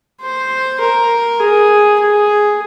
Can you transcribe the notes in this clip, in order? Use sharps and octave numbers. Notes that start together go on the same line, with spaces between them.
C5
A#4
G#4
G#4